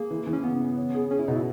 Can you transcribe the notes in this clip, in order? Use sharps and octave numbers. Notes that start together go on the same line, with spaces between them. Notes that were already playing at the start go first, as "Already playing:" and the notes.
Already playing: A#3 G#4
E3
E3
C#4
C#3 B3
C#3
C#4
G#4
C#4 G#4
E4
B2 D#4
E4